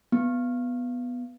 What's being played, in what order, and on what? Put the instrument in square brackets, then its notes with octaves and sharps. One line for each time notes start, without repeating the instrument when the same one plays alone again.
[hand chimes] B3